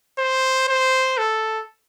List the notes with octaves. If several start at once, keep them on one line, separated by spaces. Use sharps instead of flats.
C5
C5
A4